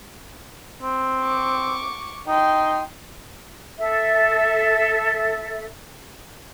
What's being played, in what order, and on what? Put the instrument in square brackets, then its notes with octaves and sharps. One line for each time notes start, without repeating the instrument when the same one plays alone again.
[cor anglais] C4
[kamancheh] C#6 D6
[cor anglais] D#4 [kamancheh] G5 C6
[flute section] A4 E5